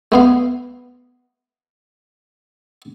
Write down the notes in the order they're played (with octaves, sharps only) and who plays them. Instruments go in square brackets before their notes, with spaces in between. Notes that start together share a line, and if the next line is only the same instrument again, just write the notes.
[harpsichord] A3 B3 F5